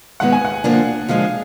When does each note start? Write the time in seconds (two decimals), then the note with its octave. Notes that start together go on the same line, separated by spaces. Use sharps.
0.20 G#2 D#3 G#3 B3 F#5
0.33 G#5
0.45 F#5
0.64 D3 F3 A#3 D4 F4
1.09 D3 F3 G#3 F5